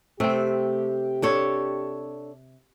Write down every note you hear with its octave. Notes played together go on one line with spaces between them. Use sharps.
C3 A3 C4 G4
D4 A4 C#5